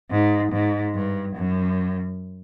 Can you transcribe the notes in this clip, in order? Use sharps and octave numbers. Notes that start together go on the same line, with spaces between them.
G#2
G#2
G2
F#2